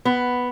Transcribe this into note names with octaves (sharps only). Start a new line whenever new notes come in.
B3